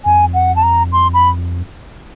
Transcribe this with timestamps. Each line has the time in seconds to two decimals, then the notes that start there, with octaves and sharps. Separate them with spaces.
0.05 F2 G#5
0.34 F#5
0.56 A5
0.63 A#5
0.92 C6
1.14 B5